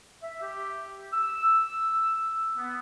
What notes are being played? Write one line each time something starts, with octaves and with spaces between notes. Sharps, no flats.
E5
G4
E6
B3